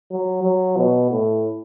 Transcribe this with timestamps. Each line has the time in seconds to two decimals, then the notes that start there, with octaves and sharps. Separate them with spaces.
0.11 F#3
0.43 F#3
0.77 B2
1.11 A2